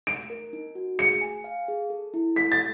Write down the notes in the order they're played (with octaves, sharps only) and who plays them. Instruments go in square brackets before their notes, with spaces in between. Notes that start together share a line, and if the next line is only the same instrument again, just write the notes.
[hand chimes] D#4 [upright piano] D7
[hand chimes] A#4
D#4
F#4
[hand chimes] G#4 [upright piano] C#7
[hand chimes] G#5
F5
G#4
A4
E4
[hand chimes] A4 [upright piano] B6
[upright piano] A6